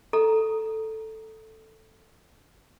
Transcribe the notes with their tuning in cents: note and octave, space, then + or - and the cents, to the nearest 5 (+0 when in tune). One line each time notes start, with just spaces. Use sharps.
A4 +0 A#5 +5